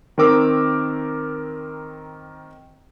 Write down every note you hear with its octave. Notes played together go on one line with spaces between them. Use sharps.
D#3 C4 A#4 D6 E6